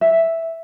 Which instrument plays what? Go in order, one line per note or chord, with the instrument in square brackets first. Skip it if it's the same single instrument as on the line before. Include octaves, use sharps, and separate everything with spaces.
[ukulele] E5